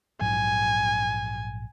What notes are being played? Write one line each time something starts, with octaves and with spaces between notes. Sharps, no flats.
A#1 G#2 F#3 G#5